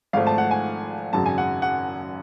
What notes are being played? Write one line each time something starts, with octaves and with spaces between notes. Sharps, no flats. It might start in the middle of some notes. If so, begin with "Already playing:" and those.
G#1 G#2 F3 A3 F5
A5
F#5
G#5
G#1 F#2 C#3 F#3 A5
G#5
F#5
F#5